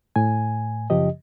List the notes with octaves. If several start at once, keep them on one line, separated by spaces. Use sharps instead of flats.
A2 G#5
F#2 C#3 F3 G4 D#5